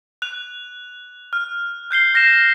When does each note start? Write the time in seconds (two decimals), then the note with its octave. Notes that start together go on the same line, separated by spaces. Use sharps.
0.22 F#6 F7
1.33 F6
1.91 F#6 G6 C7 G7
2.14 F6 A#6 C7 E7